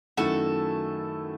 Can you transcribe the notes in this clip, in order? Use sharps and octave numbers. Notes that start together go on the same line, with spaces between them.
F#2 D#3 A3 E4 F#4 A4